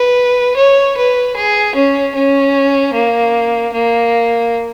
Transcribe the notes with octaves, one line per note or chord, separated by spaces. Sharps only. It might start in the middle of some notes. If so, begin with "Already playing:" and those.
Already playing: B4
C#5
B4
G#4
C#4
C#4
A#3
A#3